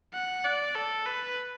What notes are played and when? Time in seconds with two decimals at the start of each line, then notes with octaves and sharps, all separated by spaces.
0.14 F#5
0.45 D5
0.75 A4
1.06 B4